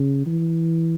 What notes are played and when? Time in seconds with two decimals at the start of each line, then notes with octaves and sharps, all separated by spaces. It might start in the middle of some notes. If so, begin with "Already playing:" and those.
Already playing: C#3
0.26 E3